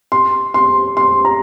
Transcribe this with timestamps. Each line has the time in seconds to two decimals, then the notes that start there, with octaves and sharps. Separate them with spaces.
0.12 C6
0.54 C6
0.97 C6
1.25 A#5